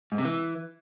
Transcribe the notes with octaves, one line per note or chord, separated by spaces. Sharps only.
G#2
C3
E3